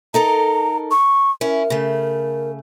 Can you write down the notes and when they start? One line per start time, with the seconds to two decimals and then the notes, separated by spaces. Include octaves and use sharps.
0.14 D#4 A4 A#4 A#5
0.91 C#6
1.41 C#4 E4 A#4
1.70 C#3 A3